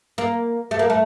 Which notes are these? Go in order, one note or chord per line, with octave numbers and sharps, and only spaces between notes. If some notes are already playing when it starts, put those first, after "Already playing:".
A#3
A3
A#3
A3